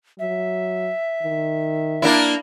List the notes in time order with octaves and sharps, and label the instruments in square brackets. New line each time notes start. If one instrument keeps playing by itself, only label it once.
[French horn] F#3 [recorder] E5
[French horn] D#3
[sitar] A#3 D4 E4